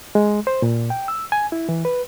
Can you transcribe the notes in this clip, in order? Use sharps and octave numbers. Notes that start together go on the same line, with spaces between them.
G#3
C5
A#2
G5
E6
G#5
E4
E3
B4